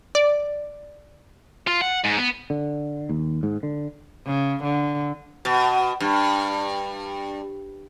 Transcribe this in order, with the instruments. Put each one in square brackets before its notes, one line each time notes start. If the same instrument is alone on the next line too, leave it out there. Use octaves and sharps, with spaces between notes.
[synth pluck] D5
[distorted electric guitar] F4
F#5
G#2
B3
[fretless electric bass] D3
D#2
G#2
D3
[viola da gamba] C#3
D3
[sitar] B2
G2